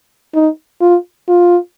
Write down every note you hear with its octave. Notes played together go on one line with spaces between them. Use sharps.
D#4
F4
F4